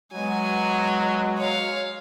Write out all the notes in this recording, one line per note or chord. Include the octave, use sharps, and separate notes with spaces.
F#3 G#3 B3 G#5
C#5 F5